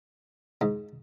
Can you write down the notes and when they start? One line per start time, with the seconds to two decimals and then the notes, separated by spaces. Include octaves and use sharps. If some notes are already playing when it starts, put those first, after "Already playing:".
0.61 G#2